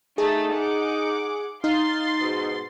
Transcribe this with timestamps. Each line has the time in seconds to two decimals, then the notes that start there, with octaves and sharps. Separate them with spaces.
0.18 A3 D#4 G#4 A6
0.55 F#5 D6
1.64 D#4 F5 C6 A6
2.20 G#2 B2